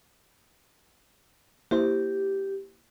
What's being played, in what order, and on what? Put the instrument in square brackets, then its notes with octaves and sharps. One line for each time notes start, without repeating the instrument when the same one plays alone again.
[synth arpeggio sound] A#3 E4 C5 [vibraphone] G4